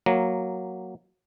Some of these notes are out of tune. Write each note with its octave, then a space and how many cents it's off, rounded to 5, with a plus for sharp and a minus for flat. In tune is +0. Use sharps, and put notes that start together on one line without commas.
F#3 +0 A#3 +0